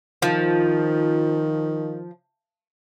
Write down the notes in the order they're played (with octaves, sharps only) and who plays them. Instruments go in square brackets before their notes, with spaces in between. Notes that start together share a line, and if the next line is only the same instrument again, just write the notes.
[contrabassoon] D#3 [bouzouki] F3